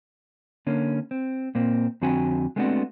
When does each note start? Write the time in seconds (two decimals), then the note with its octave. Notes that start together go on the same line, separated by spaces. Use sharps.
0.67 D3 A#3 C#4
1.11 C4
1.55 A#2 A#3 C4
2.02 F2 D3 C4 F#4 G#5
2.56 G#3 A3 B3 C4 D4 F#4